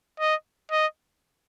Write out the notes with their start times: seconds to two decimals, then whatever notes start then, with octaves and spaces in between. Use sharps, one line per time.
0.20 D#5
0.71 D#5